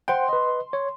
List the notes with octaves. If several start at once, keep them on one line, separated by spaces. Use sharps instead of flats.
C5 F#5 G5 C6
B4 D#5
C#5